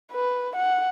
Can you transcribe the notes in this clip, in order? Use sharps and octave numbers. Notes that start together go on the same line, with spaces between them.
B4
F#5